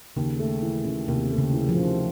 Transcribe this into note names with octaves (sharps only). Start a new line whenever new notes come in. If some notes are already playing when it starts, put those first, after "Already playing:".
D#2 C#3
A3
E3
C#3
D#2 C3
A3
C#3
E3
F3
C#3